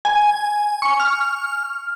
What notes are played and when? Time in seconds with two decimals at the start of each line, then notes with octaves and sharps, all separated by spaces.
0.05 G#5
0.82 C#6
1.00 F6